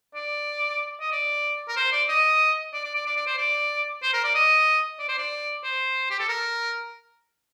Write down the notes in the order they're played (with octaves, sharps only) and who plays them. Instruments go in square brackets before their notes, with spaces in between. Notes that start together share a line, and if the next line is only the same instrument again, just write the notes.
[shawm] D5
D#5
D5
A#4
C5
D5
D#5
D5
D5
D5
D5
D5
C5
D5
C5
A#4
D5
D#5
D5
C5
D5
C5
G4
A4
A#4